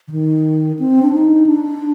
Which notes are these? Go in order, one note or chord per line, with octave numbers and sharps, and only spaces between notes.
D3
D#3
C4
D4
D#4
D4